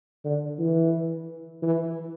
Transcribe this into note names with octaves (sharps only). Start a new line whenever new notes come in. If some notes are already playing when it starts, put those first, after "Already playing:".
D3
E3
E3